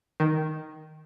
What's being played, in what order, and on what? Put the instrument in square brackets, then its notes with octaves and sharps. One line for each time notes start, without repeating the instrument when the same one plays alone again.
[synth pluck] D#3